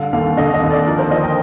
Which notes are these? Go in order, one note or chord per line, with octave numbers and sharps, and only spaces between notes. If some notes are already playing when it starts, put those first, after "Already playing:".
Already playing: D3 G3 F5
D#2 F5
D3 D#5
F5
D#5
D#2
D5
F3 A#4
C5
F3 D#5
G5